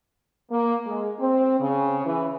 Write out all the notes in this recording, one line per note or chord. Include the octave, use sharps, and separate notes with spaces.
A#3
G#3
C4
C#3
E3